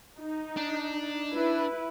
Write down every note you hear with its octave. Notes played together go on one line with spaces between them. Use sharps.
D#4
D4
E4 B4